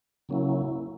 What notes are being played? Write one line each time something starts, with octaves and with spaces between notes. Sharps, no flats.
C#3 F#3 A#3 C#4 E4